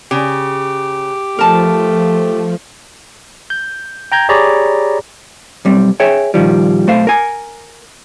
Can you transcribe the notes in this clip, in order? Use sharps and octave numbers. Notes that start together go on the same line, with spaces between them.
C#3 G4
F3 A3 A#4 A5
G6
G5 A#5 G6 G#6
G4 G#4 C#5 D5 A#5 B5
B1 G3 C4
G#4 C#5 E5 G5
A#2 D#3 F3 G3
B1 A3 C5 F5
A#4 G#5